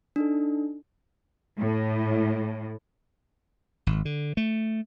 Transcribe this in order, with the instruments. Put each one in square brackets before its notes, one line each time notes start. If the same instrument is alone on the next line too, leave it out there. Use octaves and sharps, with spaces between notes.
[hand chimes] D4 D#4 A4
[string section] A2
[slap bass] G#1
D3
A3